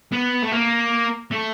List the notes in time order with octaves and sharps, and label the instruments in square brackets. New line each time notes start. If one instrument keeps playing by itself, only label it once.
[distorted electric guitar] B3
A3
A#3
A3